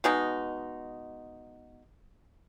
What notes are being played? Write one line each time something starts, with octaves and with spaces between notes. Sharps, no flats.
B2 G#3 D#4